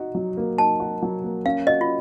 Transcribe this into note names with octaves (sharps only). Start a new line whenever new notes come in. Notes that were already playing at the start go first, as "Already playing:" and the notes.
Already playing: D#4 F#4
F#3
A#3
D#4 A5
F#4
F#3
A#3
C#4 F5
F#4 D#5
F4